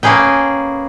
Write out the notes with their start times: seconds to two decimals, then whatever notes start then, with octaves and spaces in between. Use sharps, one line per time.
0.03 A#3 C#4 G#4 B4 G5